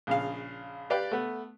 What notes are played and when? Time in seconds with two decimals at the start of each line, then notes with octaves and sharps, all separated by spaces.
0.07 A#1 C#3 F5
0.90 G4 B4 D5 F5 G5
1.11 A3 B3